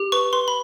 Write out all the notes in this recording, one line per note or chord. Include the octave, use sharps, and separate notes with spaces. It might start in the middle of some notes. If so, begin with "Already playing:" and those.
Already playing: G4
B4 C#6
B4 C6
B5